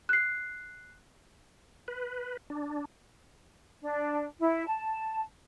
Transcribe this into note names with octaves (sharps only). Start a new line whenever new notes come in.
F#6 C7
B4
D4
D4
E4
A5